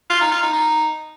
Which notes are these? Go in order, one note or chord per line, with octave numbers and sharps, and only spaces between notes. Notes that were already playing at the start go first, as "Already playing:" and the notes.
F4
D#4
F4
D#4
D#4